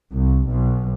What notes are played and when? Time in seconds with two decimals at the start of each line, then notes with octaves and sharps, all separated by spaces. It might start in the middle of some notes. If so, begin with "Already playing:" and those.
0.13 C2
0.48 B1